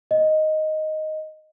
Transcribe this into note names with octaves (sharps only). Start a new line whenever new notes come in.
D#5